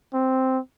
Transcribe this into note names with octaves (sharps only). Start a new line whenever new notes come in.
C4